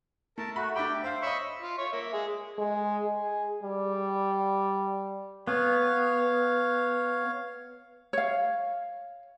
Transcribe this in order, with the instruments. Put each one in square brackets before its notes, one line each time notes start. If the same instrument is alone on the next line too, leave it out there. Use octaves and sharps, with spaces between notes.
[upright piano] A3 [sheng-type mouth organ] A#4 A5
[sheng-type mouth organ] A3 F#4 [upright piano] B5
[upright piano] D4 E5 B5 [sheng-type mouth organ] G4 G5
[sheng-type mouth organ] C5 [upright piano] E5 F5
[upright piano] C#5 D#5 [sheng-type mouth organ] B5 C#6 E6
[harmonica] F4
C#5 E5 C#6
A#3 E5
G#3 G#4
[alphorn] G#3
G#4
G3
[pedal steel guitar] B3 [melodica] C#5 F5
[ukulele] C#5 F5